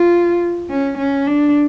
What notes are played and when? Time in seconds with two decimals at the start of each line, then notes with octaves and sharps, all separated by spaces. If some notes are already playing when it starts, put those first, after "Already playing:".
Already playing: F4
0.70 C#4
0.98 C#4
1.26 D4